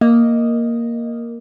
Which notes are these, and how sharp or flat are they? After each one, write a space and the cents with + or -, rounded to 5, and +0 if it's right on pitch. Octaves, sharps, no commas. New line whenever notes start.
A#3 +0 D#5 +0